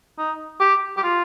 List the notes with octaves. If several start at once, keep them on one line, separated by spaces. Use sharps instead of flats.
D#4
G4
G4
F4